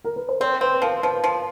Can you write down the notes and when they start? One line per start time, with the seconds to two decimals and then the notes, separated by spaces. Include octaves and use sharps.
0.04 A#4
0.16 B4
0.29 C5
0.40 C4 C#5
0.61 C4 B4
0.82 F3 A#4
1.03 F3 B4
1.24 F3